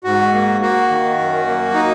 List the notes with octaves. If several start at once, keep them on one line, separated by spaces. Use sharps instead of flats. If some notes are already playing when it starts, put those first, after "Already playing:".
G#2 F#4
A#3
A#3 F#4
D#3
F#2
A#3
D#4